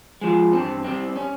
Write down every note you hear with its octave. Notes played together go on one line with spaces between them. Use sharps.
F3 G#3
G2 C4
G3 C4
C#4